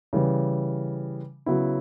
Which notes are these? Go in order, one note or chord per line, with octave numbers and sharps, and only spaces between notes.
C#3 E3 G3
C#3 F#3 B3 E4